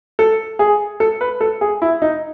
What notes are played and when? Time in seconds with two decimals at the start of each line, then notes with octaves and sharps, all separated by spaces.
0.19 A4
0.59 G#4
1.00 A4
1.21 B4
1.41 A4
1.61 G#4
1.82 E4
2.02 D#4